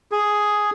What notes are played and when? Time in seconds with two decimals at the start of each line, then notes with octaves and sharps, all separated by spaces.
0.12 G#4